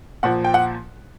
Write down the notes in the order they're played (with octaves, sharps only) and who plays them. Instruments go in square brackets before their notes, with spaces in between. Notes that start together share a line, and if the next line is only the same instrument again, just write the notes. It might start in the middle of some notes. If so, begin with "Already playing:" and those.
[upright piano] A#2 F3 F#5
G5
F#5